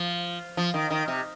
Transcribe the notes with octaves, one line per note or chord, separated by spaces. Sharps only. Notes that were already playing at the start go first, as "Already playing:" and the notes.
Already playing: F3
F3
D#3
D#3
C3